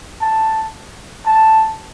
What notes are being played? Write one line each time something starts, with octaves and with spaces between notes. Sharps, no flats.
A5
A5